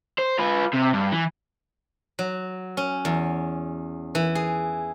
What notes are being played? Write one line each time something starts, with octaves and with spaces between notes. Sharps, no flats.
C5
F4 B4
C3
G2
E3
F#3
C#4
E2
E3
G#4